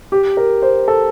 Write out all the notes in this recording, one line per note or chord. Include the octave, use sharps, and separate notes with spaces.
G4
A#4
C5
A4